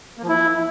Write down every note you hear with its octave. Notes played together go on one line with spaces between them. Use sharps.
A#3
F3
E4